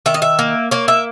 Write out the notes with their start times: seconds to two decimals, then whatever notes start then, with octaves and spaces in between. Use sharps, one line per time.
0.06 D#3 E5
0.14 D#5
0.22 E5
0.39 A#3
0.71 A#3 C#5
0.88 E5